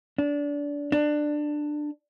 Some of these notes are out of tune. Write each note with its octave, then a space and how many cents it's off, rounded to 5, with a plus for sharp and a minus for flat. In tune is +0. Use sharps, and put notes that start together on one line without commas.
D4 -25
D4 +15